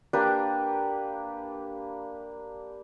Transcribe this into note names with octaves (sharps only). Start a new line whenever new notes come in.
A#3 D4 G4 B4